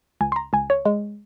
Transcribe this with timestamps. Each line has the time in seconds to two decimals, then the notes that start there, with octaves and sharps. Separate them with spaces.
0.21 C#2 G#5
0.32 C6
0.36 A#5
0.53 C#2 G#5
0.70 C#5
0.85 G#3